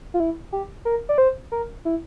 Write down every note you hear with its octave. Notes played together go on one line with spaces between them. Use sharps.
F4
E4
G4
A#4
D5
C5
A#4
E4